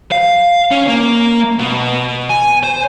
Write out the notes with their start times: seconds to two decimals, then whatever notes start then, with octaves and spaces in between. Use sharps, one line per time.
0.12 F5
0.71 C#4
0.88 A#3
1.59 B2
2.29 G#5
2.63 C5